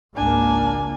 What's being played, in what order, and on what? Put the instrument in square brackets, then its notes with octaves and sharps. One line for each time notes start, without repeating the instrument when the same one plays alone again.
[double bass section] G#1 C#2 A#3 [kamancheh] D4 G#5